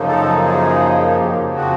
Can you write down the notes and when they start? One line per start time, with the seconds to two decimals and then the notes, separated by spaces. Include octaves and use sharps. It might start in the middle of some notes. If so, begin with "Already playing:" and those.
Already playing: F#2 C#3 F3 A#3 D#4
0.08 A4
0.46 G#4
1.19 F2 C#3 F3 G4
1.56 F#4